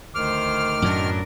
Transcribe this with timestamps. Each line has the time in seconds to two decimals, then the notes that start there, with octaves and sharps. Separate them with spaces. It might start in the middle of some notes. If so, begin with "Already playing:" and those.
0.15 D2 D#3 C5 D6 F6
0.82 F#2 A2 F#3 D4 A#4